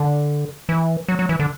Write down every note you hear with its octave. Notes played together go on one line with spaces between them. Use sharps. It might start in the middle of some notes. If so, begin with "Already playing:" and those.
Already playing: D3
E3
F#3
F#3
E3
D3